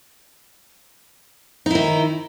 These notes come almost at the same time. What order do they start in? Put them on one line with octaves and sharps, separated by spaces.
D#4 E4 D#3